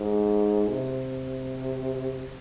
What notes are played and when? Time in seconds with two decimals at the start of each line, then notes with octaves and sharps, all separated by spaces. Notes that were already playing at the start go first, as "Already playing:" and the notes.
Already playing: G#2
0.68 C3